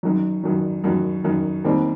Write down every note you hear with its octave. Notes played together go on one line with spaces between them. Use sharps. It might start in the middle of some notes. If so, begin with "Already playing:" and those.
F#2 D#3 F#3
F#2 D#3 F#3
F#2 D#3 F#3
F#2 D#3 F#3
D#2 D#3 G3 C4